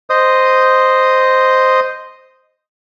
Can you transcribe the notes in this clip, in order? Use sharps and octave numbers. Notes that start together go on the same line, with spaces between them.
C5 D#5 D#6